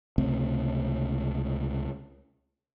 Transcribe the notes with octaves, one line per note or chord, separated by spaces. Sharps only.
C#2 C3 A3 C4